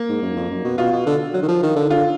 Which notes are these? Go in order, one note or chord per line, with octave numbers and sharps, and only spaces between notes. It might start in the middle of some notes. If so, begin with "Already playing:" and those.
Already playing: A#3
G#2
F#2
F2
F#2
B2
B2 F4
B2
D3
F#3
D#3
F3
D#3
D3
D3 F4